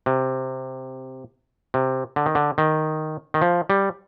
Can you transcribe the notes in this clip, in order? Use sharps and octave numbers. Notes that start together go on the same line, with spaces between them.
C3
C3
D3
D#3
D3
D#3
D#3
F3
G3